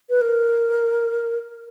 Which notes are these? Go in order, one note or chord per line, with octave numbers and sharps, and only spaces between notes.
B4
A#4